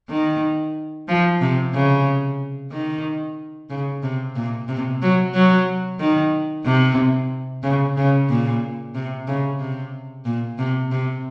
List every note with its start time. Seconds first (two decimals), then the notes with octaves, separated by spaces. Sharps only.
0.09 D#3
1.08 F3
1.41 C3
1.74 C#3
2.72 D#3
3.70 C#3
4.03 C3
4.36 A#2
4.68 C3
5.02 F#3
5.34 F#3
6.00 D#3
6.65 C3
7.63 C#3
7.97 C#3
8.29 A#2
8.95 C3
9.28 C#3
9.60 C3
10.25 A#2
10.58 C3
10.91 C3